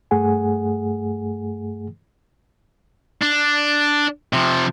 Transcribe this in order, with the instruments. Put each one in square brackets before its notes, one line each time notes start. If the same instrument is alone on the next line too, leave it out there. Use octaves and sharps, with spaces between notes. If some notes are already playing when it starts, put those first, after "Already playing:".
[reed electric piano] G2 A3 G#4 F#5 G#5
[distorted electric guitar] D4
C3 F3